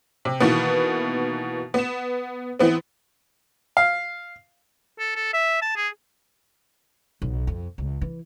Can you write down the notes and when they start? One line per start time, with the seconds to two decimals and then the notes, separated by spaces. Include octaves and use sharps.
0.25 C3
0.40 B2 D#3 E3 A#3 B3
1.74 B3 E7
2.59 E3 B3 C4
3.77 F5
4.99 A4
5.16 A4
5.33 E5
5.62 A5
5.76 G#4
7.22 B1
7.47 F2
7.78 C#2
8.01 E3